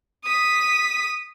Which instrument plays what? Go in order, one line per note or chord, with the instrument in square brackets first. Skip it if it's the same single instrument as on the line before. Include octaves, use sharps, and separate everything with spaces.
[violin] D#6 B6